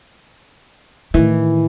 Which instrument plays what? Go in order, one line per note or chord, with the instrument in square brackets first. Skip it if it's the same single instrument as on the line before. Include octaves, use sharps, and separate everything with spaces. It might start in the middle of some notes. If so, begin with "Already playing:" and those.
[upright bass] A2 D#3 [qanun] E3